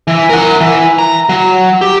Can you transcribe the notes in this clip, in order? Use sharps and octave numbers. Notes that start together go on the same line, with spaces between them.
E3
A#4 F#5
E3
A#5
F#3
G4